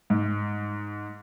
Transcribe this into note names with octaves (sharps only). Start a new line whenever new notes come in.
G#2